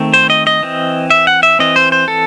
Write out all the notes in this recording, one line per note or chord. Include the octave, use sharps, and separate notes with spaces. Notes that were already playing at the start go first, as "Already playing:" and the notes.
Already playing: D#3 A3 C4
C5
D#5
D#5
E3 C4
E5
F#5
E5
E3 C4 D#5
C5
C5
A4